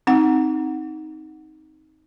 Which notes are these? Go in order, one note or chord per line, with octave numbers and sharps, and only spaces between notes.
C4 D#4 F#5